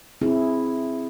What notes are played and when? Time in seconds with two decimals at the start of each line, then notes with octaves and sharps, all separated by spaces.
0.21 C4 E4 G#4